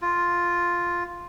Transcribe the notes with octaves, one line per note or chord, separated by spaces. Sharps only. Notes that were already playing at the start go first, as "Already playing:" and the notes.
F4